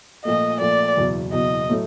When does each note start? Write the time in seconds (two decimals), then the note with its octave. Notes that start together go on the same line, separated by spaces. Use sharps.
0.25 A#2 F3 A3 D#5
0.61 A#2 F3 A3 D5
0.97 F#1 E2 B2
1.32 F#1 E2 B2 D#5
1.70 A2 F#3 A3